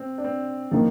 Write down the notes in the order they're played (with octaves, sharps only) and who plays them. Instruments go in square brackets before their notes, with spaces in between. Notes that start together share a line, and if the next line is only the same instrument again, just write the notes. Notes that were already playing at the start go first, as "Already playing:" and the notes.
Already playing: [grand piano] C4
D4
C4
[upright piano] D#3 A#3 [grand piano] F3